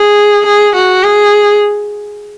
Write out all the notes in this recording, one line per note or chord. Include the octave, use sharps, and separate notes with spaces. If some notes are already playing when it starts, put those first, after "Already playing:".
Already playing: G#4
G#4
F#4
G#4